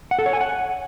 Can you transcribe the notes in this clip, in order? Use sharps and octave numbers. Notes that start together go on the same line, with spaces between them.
F#5
A4
C#5
G#5
F#5